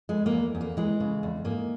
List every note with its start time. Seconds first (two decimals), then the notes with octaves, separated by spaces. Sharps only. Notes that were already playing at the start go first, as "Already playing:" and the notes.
0.09 E2 G#3
0.26 A#3
0.31 E2
0.55 E2
0.61 A#3
0.77 E3 G#3
1.00 C#3
1.23 E2
1.44 G#2 A#3